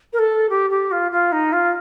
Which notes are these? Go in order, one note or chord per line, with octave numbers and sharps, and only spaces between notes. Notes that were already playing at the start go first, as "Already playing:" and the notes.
A#4
A4
G4
G4
F4
F4
D#4
F4